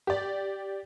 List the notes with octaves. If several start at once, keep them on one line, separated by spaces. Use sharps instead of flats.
G4 D5